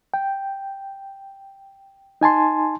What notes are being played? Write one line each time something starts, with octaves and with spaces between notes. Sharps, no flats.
G5
D#4 G#5 A5 C6